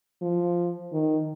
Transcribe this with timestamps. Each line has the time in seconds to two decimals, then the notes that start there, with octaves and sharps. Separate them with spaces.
0.22 F3
0.92 D#3